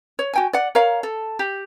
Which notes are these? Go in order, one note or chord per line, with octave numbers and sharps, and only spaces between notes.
C#5
F#4 G5 G#5
D5 F#5
A#4 C#5 F5
A4
G4